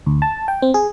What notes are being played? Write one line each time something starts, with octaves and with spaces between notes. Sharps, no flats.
D2
A5
G5
C4
G#4